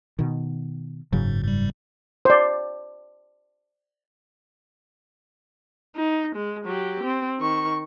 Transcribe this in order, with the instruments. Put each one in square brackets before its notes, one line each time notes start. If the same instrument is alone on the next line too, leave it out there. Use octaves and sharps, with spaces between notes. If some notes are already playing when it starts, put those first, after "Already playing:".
[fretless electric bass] B2 D#3
[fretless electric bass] F#1 C#3 F#3 [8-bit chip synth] G#2
[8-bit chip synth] G#2 G3
[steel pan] C5 D5
[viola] D#4
G#3
F#3 G4
C4
D#3 C#6